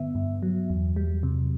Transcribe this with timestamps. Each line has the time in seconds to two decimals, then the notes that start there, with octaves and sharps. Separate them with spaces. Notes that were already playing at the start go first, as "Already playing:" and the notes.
Already playing: G2 D3 B3 E5
0.15 G2
0.42 F#3
0.70 E2
0.96 G3
1.23 C3